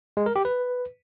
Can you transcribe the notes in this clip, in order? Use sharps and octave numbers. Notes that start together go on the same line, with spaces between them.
G#3
A#4
G4
B4